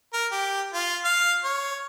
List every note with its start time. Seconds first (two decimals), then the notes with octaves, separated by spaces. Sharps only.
0.13 A#4
0.32 G4
0.74 F4
1.05 F5
1.44 C#5